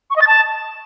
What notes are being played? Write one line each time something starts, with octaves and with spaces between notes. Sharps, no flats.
C#6
D#5
A6
A5